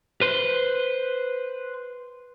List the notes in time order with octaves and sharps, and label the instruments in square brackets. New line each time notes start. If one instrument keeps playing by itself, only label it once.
[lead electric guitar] B4 C5